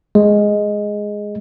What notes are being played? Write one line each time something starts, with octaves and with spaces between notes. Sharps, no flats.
G#3